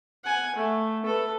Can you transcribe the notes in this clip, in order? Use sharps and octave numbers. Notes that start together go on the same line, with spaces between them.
F#5 G#5
A3
A4 B4